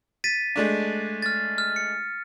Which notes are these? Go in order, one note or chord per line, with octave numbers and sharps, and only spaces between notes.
A6 B6 D#7
G#3 A3 D4
F6 A6
F6
C#7